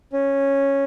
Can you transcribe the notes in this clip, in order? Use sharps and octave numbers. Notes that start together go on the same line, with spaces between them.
C#4